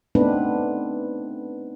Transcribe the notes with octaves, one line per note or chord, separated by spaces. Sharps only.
A3 B3 C4 D4 D#4 B4